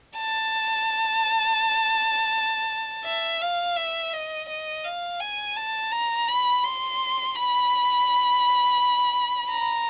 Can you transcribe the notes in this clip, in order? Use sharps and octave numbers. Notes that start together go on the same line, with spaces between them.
A5
E5
F5
E5
D#5
D#5
F5
G#5
A5
A#5
B5
C6
B5
A#5